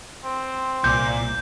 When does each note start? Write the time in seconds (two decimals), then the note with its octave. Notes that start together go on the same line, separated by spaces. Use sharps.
0.24 C4
0.84 C2 A#2 G6